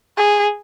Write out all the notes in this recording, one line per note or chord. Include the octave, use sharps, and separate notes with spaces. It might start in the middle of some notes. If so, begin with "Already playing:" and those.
G#4